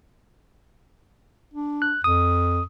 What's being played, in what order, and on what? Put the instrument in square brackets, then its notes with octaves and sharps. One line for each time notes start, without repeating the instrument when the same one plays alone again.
[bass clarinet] D4
[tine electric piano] F#6
[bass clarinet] F2 [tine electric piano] D#6